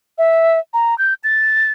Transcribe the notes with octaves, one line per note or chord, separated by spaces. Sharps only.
E5
A#5
G6
A6